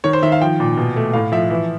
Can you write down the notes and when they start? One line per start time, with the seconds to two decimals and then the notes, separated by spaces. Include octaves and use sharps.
0.04 D#3 C#5
0.13 C5
0.22 D#3 E5
0.32 F5
0.41 F3 G5
0.60 A#2
0.77 B2
0.96 A3
1.13 A2 F5
1.32 F3 E5
1.50 E3 E5